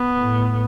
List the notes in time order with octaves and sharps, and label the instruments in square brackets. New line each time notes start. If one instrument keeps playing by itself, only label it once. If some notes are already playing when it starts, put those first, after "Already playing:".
Already playing: [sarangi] B3
[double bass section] A2